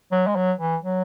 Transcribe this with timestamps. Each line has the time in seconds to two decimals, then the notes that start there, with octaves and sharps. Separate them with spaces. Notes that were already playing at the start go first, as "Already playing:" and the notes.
0.12 F#3
0.27 G#3
0.36 F#3
0.59 E3
0.83 F#3